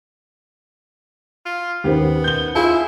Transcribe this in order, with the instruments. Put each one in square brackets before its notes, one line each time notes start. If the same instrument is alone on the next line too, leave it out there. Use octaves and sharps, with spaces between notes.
[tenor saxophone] F4
[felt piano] D#2 C#4 C5 [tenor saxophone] B3 [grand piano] G4
[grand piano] G6 G7
[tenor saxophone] E4 [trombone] F4 [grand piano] G#4